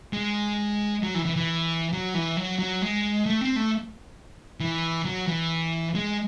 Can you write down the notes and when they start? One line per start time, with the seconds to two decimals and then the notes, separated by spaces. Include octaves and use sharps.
0.13 G#3
1.03 F#3
1.15 E3
1.25 E3
1.36 E3
1.93 F#3
2.14 E3
2.37 F#3
2.59 F#3
2.82 G#3
3.26 A3
3.41 C4
3.56 A3
4.60 E3
5.05 F#3
5.27 E3
5.95 G#3